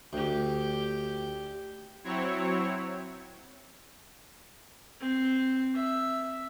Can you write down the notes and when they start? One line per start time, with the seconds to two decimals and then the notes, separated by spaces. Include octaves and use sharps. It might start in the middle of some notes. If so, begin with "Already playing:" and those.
0.13 D2 G4 G5
2.04 F#3 C4 E4 C#5
5.00 C4
5.75 E5